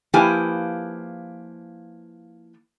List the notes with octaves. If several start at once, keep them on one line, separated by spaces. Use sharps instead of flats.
F3 A#3 E4 G4 B4 G#5